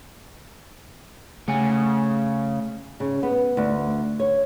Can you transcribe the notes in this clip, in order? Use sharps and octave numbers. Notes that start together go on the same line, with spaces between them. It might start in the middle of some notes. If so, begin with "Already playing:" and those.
C#3 A3 F#5 G#5
C#3
B3
D2
C#5